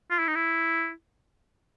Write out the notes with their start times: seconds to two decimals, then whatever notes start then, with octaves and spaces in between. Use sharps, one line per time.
0.11 F4
0.19 E4
0.27 D#4
0.35 E4